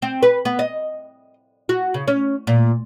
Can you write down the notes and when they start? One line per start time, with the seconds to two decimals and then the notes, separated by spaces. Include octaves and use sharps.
0.02 C4
0.23 B4
0.45 B3
0.59 D#5
1.69 F#4
1.94 C#3
2.08 C#4
2.47 A#2